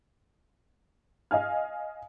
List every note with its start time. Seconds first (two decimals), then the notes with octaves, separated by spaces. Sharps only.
1.31 D#5 F5 G#5 F6